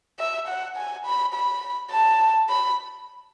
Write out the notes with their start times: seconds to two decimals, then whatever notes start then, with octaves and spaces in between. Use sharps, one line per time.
0.19 E5
0.48 F#5
0.77 G#5
1.05 B5
1.34 B5
1.91 A5
2.49 B5